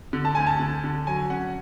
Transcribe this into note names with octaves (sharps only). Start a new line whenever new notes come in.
D3
A5
D2 G#5
A5
D3
D3
F#3 G#5
C#4 F#5